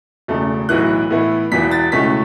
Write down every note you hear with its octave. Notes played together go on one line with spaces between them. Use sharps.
E1 E2 C#3 A3
B1 A2 E3 B3 E4 F#6
A2 E3 B3 E4
E1 E2 E3 B6
A6
C#2 B2 A3 C#4 E4 B6